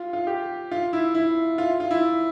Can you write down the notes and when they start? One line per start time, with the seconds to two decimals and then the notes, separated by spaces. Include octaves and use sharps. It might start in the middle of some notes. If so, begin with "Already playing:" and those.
Already playing: F4
0.13 F4
0.27 G4
0.71 F4
0.93 E4
1.15 E4
1.58 F4
1.80 F4
1.91 E4